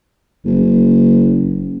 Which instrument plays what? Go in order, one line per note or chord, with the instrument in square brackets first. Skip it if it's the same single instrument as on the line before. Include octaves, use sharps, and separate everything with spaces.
[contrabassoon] F#1